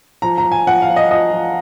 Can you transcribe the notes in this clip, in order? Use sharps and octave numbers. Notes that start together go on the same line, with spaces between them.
F3 A#5
A#5
F3
G#5
F3 F#5
F5
F3
D#5
F3 D#5
F3